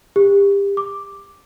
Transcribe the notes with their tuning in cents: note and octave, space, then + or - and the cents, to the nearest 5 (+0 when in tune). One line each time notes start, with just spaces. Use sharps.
G4 +30
D6 +0